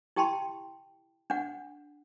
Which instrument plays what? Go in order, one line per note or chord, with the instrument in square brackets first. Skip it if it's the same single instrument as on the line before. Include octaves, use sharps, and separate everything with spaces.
[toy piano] E4 G4 G5 A5 B5 C6
D4 F#5